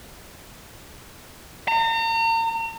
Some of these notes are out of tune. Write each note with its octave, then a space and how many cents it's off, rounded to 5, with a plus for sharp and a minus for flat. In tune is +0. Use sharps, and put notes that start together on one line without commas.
A#5 -40